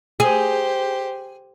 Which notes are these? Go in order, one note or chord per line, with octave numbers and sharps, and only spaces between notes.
G4 G#4 C5